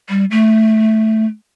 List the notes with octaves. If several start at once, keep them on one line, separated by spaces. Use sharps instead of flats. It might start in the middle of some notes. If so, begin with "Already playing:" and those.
G3
A3